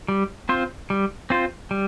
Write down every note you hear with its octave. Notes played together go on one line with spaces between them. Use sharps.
G3
C4 F4 C5
G3
C4 F4 C5
G3